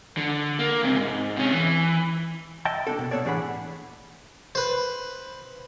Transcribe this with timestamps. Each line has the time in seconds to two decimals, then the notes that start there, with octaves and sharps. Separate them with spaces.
0.17 D3
0.59 A#3
0.83 C#2 C3
0.97 G#2
1.37 C3 C#4
1.52 E3
2.65 D#5 E5 G5 A5
2.87 A#3 C4 D4 A4
2.99 B2
3.11 A#3 B3 A4 C#5 D5
3.25 A2 E3 D4 G#4 F#5 B5
4.55 B4 C5